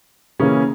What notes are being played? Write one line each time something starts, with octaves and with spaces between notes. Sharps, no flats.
C#3 E3 A#3 C#4 G#4